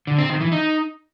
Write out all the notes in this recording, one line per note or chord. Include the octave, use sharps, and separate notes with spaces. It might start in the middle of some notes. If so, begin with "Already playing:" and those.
D3
C4
D#3
E3
D#4